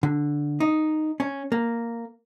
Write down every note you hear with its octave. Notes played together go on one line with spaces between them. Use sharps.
D3
D#4
C#4
A#3